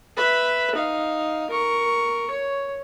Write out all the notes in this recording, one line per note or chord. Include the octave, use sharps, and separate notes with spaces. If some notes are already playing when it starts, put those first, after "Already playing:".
B4 E5
D#4 F5
A#4 C#6
C#5